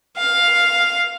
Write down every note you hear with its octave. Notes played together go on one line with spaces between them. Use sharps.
F5